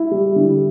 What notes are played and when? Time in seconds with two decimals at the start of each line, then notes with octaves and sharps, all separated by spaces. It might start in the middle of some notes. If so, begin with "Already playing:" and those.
Already playing: E4
0.11 G3
0.36 D3